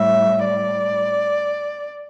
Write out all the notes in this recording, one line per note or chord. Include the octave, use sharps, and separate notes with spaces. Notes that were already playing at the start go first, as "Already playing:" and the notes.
Already playing: A2 G3 E5
D5